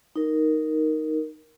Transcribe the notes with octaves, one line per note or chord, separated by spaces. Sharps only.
D#4 A#4